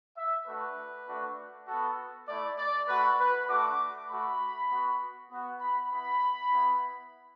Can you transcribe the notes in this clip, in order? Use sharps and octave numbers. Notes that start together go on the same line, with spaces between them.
E5
A3 D4 F#4 B4
A3 D4 F#4
B3 F#4 A4
A3 E4 D5
D5
A3 F#4 B4
B4
A3 D4 F#4 D6
A3 F#4 B5
B3 F#4
B3 F#4
B5
B3 E4 B5
B3 E4